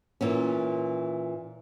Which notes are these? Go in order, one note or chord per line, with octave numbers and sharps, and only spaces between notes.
A#2 E3 C#4